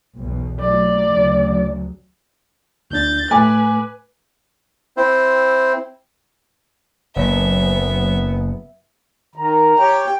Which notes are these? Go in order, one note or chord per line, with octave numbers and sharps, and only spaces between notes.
B1 E2 B2
F#3 A3 D5
D2 C#3 F#3
D2 D4 G6 A6
A2 A3 B4 G#5 D6
C4 E4 C5
F#1 F#3 B3 E5
D#3 A#5
G4 C#5 G5